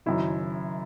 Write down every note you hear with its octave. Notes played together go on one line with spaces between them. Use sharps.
F#1 F#2 D#3 E4